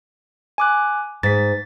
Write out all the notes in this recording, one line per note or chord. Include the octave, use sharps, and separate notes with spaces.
G#5 D6 F#6
G#2 A6 B6